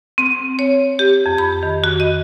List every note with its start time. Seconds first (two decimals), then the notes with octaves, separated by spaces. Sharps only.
0.18 C4
0.59 C#5
0.99 G4
1.26 F2
1.38 B5
1.63 D#3
1.84 F#4
2.00 D#5